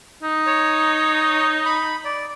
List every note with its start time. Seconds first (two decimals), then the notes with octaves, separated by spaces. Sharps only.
0.23 D#4
0.47 C#5
1.65 B5
2.05 D5